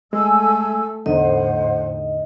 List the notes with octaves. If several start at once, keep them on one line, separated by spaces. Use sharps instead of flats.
G#3 A3 G#5 E6
E2 A2 D3 D#4 C5 D#5 F#5